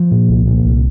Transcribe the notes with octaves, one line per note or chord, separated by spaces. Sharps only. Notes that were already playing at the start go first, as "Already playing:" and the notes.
Already playing: F3
A#2
C2
A#2
C2